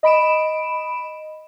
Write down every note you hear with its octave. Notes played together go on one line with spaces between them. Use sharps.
D#5 B5 D7 E7